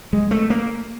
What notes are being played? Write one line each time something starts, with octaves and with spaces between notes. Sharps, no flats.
G#3
A3
A#3